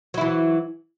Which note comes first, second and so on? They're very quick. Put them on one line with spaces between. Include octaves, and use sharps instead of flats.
F#3 E4 E3